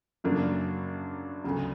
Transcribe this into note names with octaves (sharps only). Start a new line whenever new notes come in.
F#2 C#3 F#3 A#3 D4
D2 C#3 F#3